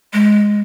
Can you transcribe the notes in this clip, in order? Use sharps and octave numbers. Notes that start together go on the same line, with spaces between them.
G#3